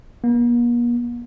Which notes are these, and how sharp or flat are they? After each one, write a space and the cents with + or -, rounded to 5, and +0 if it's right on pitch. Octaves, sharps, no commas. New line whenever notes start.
A#3 +45